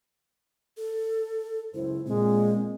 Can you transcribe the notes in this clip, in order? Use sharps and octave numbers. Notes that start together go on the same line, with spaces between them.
A4
C#2 F#2 E4 C5
A#2 G#3 C4